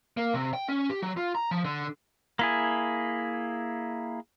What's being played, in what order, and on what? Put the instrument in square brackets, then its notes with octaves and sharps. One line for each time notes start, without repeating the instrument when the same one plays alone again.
[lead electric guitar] A#3
C3
G5
C#4
G4
F#3
F4
A#5
F3
D3
[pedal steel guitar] A#3 E4 G#4